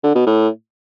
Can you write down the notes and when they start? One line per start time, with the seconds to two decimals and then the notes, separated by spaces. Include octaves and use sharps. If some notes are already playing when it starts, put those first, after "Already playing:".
0.04 D3
0.15 B2
0.26 A2